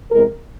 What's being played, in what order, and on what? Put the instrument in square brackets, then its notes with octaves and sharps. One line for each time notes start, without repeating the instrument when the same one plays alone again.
[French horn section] E2 C3 E3 G#3 A#4